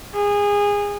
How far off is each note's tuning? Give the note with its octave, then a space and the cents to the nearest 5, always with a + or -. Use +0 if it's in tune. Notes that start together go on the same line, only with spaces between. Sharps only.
G#4 -25